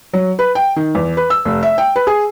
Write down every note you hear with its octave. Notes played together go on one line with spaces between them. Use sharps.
F#3
B4
G5
D#3
E2
B4
E6
F1
E5
G5
B4
G#4